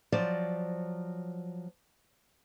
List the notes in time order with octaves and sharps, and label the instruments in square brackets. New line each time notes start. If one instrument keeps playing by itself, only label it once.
[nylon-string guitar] F3 F#3 C5 D5